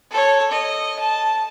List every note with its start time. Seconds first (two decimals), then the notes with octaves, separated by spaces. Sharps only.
0.11 A4 C#5
0.51 D#5
0.99 A5